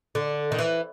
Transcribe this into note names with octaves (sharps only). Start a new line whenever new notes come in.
D3
D#3
E3